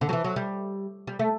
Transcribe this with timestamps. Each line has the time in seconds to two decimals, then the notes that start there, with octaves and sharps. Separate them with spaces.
0.01 D3
0.09 F#3
0.13 E3
0.24 F#3
0.36 G3
1.07 G3
1.19 A3